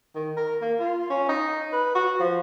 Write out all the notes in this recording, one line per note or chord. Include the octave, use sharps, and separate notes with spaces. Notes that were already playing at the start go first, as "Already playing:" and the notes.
D#3
A#4
A#3
F4
C#4
D#4
B4
F#4
F3